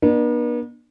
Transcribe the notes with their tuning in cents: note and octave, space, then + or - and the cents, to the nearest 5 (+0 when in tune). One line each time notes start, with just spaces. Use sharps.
B3 -45 D4 +40 D5 +30